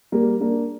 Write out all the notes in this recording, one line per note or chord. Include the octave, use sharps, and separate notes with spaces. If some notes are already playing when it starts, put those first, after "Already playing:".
G3 A#3
A#3 D4